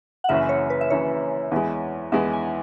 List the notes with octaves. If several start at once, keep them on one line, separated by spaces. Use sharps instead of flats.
F#5
F#1 F#2 E3 C#4 E5
C#5
B4
E5
F#1 F#2 E3 C#4 C#5
E2 E3 G#3
E2 E3 G#3 E5
G#5